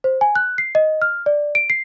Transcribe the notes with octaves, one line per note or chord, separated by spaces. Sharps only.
C5
G#5
F#6
C7
D#5
F6
D5
D7
C7